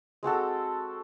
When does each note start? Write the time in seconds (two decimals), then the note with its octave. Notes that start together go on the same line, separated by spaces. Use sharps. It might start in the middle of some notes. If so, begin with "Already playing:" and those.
0.23 G#3 C4 F#4 A4